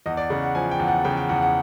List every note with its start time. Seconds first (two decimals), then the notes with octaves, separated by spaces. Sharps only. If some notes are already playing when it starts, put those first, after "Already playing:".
0.06 E2 D#5
0.17 D5
0.30 C#3 F#5
0.43 F#5
0.55 F3 G#5
0.71 G5
0.79 E2
0.88 F#5
1.04 C#3 G5
1.17 G5
1.29 E2 F#5
1.42 F#5